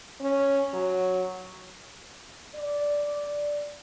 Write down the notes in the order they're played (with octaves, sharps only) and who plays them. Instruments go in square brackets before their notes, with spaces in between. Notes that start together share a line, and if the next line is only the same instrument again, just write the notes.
[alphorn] C#4
F#3
[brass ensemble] D5